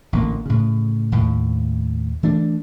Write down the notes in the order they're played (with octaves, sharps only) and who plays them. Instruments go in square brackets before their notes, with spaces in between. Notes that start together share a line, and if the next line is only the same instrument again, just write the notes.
[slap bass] A1 D3 A#3
A2 C#3
D#2 A2
E3 A3 D4